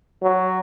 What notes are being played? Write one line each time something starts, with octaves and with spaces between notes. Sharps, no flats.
F#3